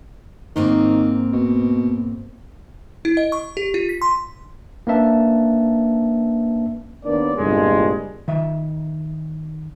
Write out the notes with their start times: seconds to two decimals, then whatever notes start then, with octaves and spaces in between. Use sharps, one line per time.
0.56 G#2 D#3 A#3 C4
1.33 B2
3.05 E4
3.17 D#5
3.32 C#6
3.57 G4
3.74 F4
3.89 B6
4.02 C6
4.87 A#3 C#4 D4 B4 E5 A5
7.06 D#2 A#3 B3 C#4 D4 D5
7.37 G1 C2 G2 A#2 G#3
8.28 D#3 E5